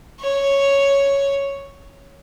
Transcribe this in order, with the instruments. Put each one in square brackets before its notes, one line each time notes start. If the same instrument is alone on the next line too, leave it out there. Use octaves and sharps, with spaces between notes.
[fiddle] C#5